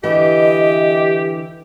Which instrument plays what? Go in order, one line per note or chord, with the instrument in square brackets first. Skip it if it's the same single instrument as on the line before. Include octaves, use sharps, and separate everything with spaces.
[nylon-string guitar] D3 E3 B3 [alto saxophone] G4 [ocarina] D#5